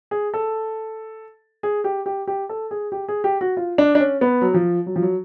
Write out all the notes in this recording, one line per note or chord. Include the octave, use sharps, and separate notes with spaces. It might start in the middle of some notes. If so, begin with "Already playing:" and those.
G#4
A4
G#4
G4
G4
G4
A4
G#4
G4
G#4
G4
F#4
F4
D4
D4
C#4
B3
F#3
F3
F#3
F3
F#3